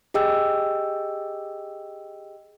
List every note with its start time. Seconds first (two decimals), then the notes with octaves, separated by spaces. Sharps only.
0.14 G4 G#4 D#5 G5 E6